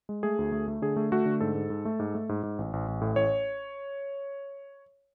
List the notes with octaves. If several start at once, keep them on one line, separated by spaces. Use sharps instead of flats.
G#3
A3 G#4
D2
A3
A3
D3 G#4
A3
A3 F#4
D3
G#2 A4
G#2
G#2
A3
G#2
A3
G#2
G#2
A1
A1
A1
A2
A1 C#5